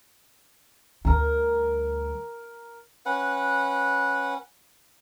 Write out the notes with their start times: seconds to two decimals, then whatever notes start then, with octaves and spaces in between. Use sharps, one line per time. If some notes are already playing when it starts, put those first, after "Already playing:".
1.05 D2 G3 A#4 A#5
3.06 C#4 B4 F#5